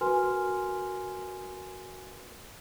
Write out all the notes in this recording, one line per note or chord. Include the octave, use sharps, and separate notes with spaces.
F#4 A#4 B4 G#5 C6 F6